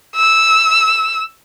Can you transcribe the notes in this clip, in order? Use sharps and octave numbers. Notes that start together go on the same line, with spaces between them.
E6